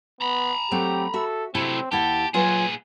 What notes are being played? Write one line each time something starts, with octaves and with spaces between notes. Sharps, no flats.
B3 A#5 B5
F#3 A3 C4 G4
F#4 A4 E5
C3 F#3 A3 C4 E4 A5
D#2 E4 G4 F#5 A5
A#2 F#3 F4 G#4 B4 G#5